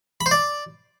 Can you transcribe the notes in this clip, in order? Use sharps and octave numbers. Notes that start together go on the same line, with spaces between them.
B5
C5
D5